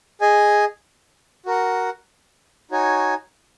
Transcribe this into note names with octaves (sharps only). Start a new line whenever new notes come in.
G#4 D#5 G#5
F#4 A#4 F#5
D#4 F#4 C#5 G#5